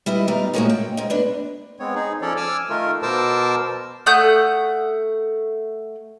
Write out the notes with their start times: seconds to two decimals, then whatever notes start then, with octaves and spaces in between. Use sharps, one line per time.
0.06 G3 E4 B4 D#5
0.28 D#3 G3 B3 D#4 A#4
0.54 A2 C3 G#3 A#3 D#4 F#4
0.70 G5
0.97 G#2 D#4
1.10 B3 D4 B4
1.80 G#3 B3 C4 C#5
1.95 D#4 G#4
2.22 F3 C#4 A4 C#5 D5
2.37 G#5 D6 E6 F6
2.70 D#3 A3 F4 A#4
3.03 B2 A#4 C5 A5 D6 E6
4.06 A3 F#5 D#6 G6